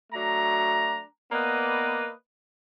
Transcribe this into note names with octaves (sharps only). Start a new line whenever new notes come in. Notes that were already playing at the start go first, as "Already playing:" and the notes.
F#3 A3 D4 A#5
A#3 B3 B4 D5 D#5